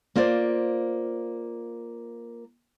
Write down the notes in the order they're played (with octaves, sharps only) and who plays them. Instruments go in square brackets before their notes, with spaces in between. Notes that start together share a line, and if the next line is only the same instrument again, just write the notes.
[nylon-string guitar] A#3 F4 C5 D5